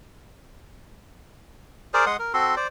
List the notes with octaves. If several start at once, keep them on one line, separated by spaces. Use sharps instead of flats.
G#4 A#4 C5 D5
G#3 F#5 C6 D#6
A#4
C4 F#4 A4 C6
C5 D5